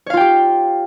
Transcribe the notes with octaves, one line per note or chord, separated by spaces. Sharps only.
F4 G4 C#5 F5 G5